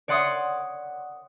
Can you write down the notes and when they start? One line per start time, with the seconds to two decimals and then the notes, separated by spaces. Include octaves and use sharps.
0.08 C#5 D5 F#5 C6 D#6